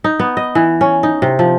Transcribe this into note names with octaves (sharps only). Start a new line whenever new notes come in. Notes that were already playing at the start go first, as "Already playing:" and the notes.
D#4
B3
D#5
E3
C#4
D#4
C3
F3